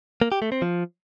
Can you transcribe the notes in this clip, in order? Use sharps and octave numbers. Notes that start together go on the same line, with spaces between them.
A#3
G4
A3
C4
F3